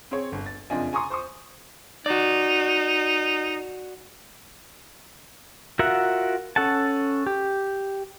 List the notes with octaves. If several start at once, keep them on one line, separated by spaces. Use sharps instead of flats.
C4 G#4 C#5
G1
A6
F#1 F2 D4 F4 D#5 G#5
G#5 A#5 C6 C#6 D#6
C5 C6 C#6 D#6
D#4 F#4 D5
F4 F#4 A#4 E5 F#5
C#4 A4 F#5 A5
G4